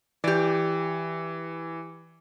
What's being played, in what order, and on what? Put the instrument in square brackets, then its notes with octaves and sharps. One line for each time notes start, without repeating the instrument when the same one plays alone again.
[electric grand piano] E3 [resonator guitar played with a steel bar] G4 D5